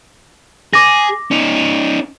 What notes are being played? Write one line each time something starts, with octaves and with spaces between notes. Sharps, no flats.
G#4 D6 A#6
C#4 D#4